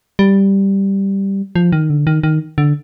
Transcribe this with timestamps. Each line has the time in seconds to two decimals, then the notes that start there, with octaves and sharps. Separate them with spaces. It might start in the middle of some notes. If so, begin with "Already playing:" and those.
0.19 G3
1.56 F3
1.72 D#3
1.90 D3
2.07 D#3
2.23 D#3
2.58 D3